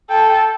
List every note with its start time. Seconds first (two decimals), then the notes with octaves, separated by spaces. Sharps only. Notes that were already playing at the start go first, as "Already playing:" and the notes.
0.10 A4 G5
0.29 G5